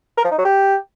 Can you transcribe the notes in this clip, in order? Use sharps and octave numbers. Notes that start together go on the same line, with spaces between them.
A#4
F3
D#4
F#3
G4